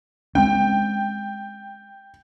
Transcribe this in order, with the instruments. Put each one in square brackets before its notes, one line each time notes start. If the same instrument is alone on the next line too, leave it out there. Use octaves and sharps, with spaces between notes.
[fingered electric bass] G#3 C4 C#4 [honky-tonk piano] G5